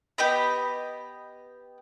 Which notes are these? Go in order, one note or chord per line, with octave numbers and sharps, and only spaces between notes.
B3 G4 D#5 B5